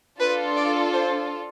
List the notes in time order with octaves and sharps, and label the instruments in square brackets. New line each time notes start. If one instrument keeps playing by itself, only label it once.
[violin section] D4 F4 A4 [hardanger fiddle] B4
[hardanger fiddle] D5
C5